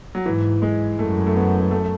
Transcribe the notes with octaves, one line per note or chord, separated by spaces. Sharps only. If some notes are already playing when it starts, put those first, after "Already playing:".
F#3
G#2 E3
G#3
F#2 A3
A3
B3
A3